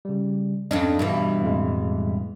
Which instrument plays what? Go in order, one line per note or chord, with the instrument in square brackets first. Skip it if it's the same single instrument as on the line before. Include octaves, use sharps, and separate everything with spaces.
[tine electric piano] C#3 G3
[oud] F2 C#4 D4 [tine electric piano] D#5
[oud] G2 B2 E3
[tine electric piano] F2 A2 G#3